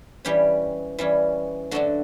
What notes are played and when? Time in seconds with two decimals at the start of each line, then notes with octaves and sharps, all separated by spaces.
0.25 E3 G3 C#4 G4
0.99 E3 G3 C#4
1.71 D3 F#3 A3 D4 F#4